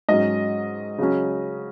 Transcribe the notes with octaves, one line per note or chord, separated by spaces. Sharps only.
G#2 F#3 C#4 D#5
C#3 F#3 C#4